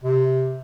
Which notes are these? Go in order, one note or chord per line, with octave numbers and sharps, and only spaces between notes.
C3